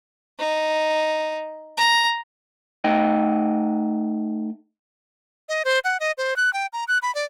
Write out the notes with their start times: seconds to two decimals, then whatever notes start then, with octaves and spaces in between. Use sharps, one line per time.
0.39 D#4
1.78 A#5
2.84 A3 D#4 D#5 G5
5.49 D#5
5.65 C5
5.84 F#5
6.00 D#5
6.18 C5
6.36 F#6
6.53 G5
6.73 A#5
6.88 F#6
7.02 B5
7.15 D5